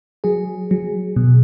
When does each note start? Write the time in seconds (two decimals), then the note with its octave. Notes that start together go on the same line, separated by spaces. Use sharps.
0.24 F#3 G#4
0.71 F#3
1.16 B2